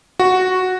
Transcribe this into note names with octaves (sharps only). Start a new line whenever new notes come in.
F#4